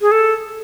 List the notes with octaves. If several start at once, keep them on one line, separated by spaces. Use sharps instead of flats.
G#4
A4